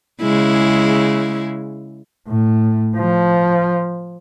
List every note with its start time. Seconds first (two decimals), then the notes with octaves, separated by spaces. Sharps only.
0.21 C#3 G#3 E4
2.28 A2
2.97 F3